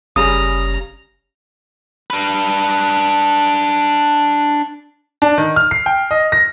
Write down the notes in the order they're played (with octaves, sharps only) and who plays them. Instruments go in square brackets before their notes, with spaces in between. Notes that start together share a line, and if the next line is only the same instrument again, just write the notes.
[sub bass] F#1 [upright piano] C#3 G3 G#4 [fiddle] A#5 [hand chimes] D#6
[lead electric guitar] D4 B4
[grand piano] D4
D#3
F6
C7
G5
D#5
A#6